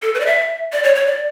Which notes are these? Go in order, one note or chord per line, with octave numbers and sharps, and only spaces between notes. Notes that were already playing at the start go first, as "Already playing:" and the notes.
A4
B4
D5
E5
D5
C#5
C#5
D5